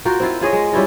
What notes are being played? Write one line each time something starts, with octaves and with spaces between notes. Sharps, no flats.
F4 F#4 A#4 G5
C4 E4 F4
F4 G#4 C#5 D#5
G#3
G3 C#4 E4 F4